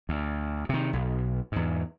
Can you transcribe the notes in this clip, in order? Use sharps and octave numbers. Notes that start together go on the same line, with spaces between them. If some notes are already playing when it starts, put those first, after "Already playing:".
D2
C3 D#3
B1
E2 G#2